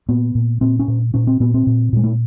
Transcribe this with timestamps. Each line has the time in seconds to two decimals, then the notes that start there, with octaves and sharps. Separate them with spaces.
0.09 A#2 B3
0.35 A#2
0.61 A#2 C4
0.79 C#4
0.88 A#2
1.14 A#2 C#4
1.27 C4
1.40 A#2 B3
1.54 C4
1.67 A#2
1.93 A#2 G#3
2.04 A3